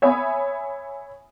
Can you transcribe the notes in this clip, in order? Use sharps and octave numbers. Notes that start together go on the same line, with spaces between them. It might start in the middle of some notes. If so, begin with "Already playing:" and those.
C#5 E5 G#5 B5 D#6